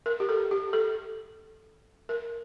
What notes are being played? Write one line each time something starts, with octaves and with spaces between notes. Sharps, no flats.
A#4
G4
A4
G4
A4
A#4